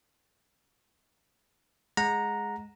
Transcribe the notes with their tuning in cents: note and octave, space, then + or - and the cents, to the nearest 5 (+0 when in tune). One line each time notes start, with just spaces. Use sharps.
G#3 +0 F#5 -20 A#5 +0